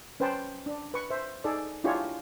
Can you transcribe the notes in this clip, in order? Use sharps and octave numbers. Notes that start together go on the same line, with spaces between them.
C#4 B4 C5 G5 A5
D4
B4 C#6
C5 E5
D#4 G#4 A4 D5
D4 E4 F4 G4 G#4 C#5